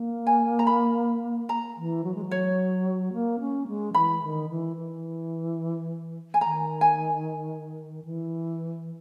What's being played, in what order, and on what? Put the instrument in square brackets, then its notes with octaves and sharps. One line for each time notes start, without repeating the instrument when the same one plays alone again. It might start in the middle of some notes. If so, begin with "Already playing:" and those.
Already playing: [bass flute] A#3
[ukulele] G#5
A#5
B5
A#5
[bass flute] E3
F#3
G#3
F#3
[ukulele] C#5
[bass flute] A#3
C#4
G#3
[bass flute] E3 [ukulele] B5
[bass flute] D#3
E3
E3
[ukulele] G#5
[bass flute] D#3 [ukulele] A#5
[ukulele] G#5
[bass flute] E3